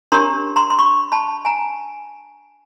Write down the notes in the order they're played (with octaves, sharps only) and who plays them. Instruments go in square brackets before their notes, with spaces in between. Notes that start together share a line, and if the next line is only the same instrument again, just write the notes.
[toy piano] D4 G4 A#4 C#5 A#5 C6
A#5 C6
C6
B5 C#6
A5 B5
G#5 A#5